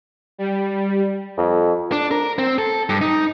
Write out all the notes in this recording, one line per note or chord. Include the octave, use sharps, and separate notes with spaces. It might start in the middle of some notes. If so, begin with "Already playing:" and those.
G3
F2
D4
A#4
C4
A4
G2
D#4